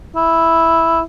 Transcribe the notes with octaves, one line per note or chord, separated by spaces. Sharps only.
E4